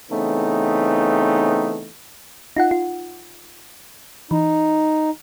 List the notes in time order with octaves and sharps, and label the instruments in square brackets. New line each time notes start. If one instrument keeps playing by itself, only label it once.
[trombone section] C#3 E3 A3 B3 C4 D#4
[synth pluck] D#4 F4 F#5
F4
[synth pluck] E3 [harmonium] D#4